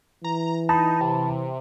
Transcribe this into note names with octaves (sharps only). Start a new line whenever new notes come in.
E3 A#5
D#4 A5 B5
C3